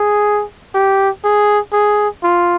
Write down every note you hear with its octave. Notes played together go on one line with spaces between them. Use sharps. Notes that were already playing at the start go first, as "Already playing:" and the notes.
Already playing: G#4
G4
G#4
G#4
F4